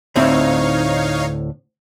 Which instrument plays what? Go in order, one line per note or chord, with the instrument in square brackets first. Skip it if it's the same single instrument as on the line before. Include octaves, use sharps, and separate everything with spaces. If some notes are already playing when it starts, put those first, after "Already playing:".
[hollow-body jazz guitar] D2 A2 C4 [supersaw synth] D#4 C#5 F5